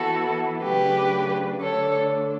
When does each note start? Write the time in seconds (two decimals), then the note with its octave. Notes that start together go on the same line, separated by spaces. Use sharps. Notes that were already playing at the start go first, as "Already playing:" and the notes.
Already playing: E3 B3 E4 F#4 A4
0.63 C#3 F#3 A3 D4 G4 B4
1.60 D3 A3 D4 A4 C#5